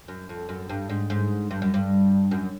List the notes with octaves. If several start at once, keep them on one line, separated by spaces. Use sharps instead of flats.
F#2
F2
F#2
G2
G#2
G#2
G2
F#2
G2
F#2